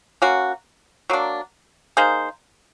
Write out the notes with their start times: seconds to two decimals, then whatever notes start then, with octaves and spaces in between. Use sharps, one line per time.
0.22 A#3 C#4 F#4
1.10 F#3 A#3 D4
1.97 A#3 D#4 G#4 C5